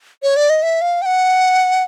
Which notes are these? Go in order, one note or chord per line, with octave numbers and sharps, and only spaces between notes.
C#5
D5
D#5
E5
F5
G5
F#5